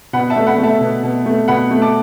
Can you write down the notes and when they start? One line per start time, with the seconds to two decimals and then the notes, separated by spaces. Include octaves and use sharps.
0.13 B2 F#5 B5
0.30 E5 A5
0.36 A3
0.47 F#5 B5
0.58 A3
0.63 E5 A5
0.81 B2
1.03 B2
1.26 A3
1.48 B2 F#5 B5
1.71 A3
1.82 A5 D6